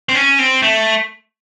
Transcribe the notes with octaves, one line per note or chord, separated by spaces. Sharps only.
C4
C#4
C4
A3